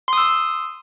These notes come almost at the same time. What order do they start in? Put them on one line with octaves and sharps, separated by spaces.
C6 D#6 E6